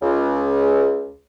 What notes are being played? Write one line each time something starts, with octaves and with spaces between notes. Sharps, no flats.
C#2